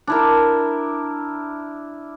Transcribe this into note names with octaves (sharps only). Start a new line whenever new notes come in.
D4 E4 A#4